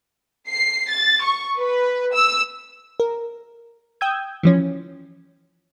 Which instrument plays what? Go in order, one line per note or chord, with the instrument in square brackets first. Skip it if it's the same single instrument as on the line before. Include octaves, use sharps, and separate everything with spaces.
[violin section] C7
A6
C#6
B4
E6
[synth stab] A#4
G5 D#6 E6 G6 G#6
E3 F3 C#4